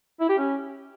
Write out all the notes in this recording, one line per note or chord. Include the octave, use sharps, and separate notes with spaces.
E4
G4
C#4